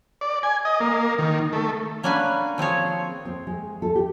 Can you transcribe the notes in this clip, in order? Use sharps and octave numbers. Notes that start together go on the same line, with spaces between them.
D5
G#5
D#5
A#3
D#3
A3
A#3 C#4 D4 F#4 B4 G#5
F3 C4 G#4 C#5
C4
G#3
A4
G4